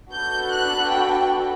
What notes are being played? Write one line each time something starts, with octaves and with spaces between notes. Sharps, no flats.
B3 D4 F#4 A4 G6
F#6
G5